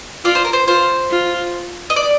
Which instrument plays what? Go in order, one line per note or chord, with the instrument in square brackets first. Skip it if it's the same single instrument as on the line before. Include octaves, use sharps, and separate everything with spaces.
[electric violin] F4 [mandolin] D5
[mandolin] C5
A#4
C5
[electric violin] F4 [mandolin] C5
[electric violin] F4
[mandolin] D#5
D5